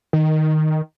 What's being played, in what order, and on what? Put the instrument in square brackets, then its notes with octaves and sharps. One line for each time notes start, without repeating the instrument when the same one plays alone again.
[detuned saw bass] D#3